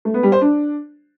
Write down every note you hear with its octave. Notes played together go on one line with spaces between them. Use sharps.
A3
B3
G3
C5
D4